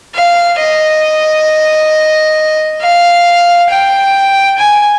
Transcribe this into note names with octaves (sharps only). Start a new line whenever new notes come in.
F5
D#5
F5
G5
G#5